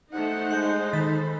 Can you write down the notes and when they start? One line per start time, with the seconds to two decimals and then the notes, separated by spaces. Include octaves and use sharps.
0.12 A3 D#4 C5 F#5
0.50 G#3 F#6 G6
0.93 D#3 A4 B5 A6 B6